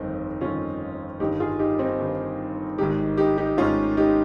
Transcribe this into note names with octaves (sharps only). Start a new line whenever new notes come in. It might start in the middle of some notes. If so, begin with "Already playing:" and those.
Already playing: G1 F2 D#3 C4 D#4
G1 F2 D#3 C#4 F4
G1 G2 D#3 D#4 G4
F4 G#4
D#4 G4
C4 D#4
G1 G2 D#3
G#1 G#2 D#3 D#4 G4
D#4 G4
D#4 G4
G#1 G#2 D#3 C#4 F4
D#4 G4